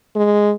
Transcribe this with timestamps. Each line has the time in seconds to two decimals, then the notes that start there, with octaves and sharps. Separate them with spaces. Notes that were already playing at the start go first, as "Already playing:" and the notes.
0.16 G#3